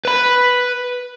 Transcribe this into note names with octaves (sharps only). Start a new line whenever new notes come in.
B4 B5